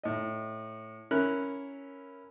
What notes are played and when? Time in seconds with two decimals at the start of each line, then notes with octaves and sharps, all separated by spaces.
0.03 A2 D#5
1.11 C#4 E4 A#4 F#6